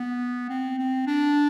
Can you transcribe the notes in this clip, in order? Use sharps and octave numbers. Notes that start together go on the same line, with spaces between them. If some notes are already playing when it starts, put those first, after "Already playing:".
Already playing: B3
C4
C4
D4